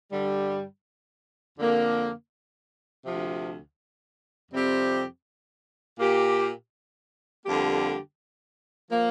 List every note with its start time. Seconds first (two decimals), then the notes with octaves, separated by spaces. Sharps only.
0.11 G2 D3 G3
1.58 F2 D3 A#3
3.04 D2 C3 F3
4.51 F2 C3 G3 C4 G4
5.98 A#2 A#3 G4
7.45 F2 D3 G3 A#3 G4
8.91 F3 A#3